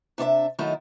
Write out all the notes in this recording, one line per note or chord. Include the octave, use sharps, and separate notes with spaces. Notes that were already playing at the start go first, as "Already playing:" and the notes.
C3 D4 C#5 E5
D#3 F#3 A3 D#4 E4